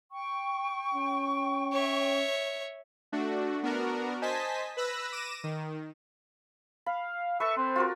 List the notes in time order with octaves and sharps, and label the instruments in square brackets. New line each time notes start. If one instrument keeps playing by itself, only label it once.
[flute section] G5 C#6
[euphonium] C#4
[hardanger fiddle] C#5 E5
[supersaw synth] A3 D4 F#4
B3 D4 F#4 A#4
C5 D#5 G#5 A5 B6
B4 B5 E6 F#6 A#6
D6 A#6 D#7 E7
D#3
[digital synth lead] F5 [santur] B5
[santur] A4 B4 [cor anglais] E5 [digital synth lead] C#6
[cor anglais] C4 [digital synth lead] C5
[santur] F4 F#4 A#4